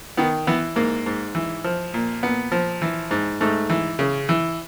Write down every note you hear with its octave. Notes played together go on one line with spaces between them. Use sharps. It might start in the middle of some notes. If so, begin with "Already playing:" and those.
D#3 B3
E3 B3
G#2 A#3
G#2
E3
F3
A#2
A#2 B3
F3
E3
G#2
G#2 A3
E3
C#3
E3